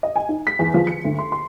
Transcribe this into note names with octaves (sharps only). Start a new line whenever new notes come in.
D#5
G#5
D#4
B6
E2
F3
C#7
D2
C6
C6